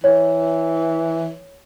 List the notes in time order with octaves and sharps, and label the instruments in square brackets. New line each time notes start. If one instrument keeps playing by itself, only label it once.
[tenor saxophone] E3 [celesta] C#5